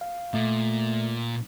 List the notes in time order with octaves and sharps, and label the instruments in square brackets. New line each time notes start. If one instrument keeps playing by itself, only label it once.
[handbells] F5
[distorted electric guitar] A#2 [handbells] A3